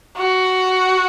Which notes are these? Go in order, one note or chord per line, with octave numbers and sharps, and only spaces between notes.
F#4